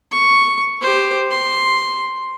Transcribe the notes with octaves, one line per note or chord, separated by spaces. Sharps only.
C#6
G4 C5
C6